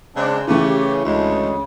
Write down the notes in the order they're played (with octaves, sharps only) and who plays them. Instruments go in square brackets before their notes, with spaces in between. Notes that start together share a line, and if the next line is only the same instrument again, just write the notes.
[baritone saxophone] C#3 [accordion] G#3 C4 D4
[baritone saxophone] C#3 [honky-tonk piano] E3 A3 [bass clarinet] C#4 [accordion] G4
[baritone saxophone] D2 [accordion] C#3 [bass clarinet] G#3